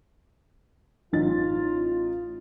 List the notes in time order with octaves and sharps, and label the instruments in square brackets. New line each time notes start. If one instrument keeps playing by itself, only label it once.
[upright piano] A1 D#4 A6 [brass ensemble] F4